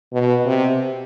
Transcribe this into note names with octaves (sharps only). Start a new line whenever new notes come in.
B2
C3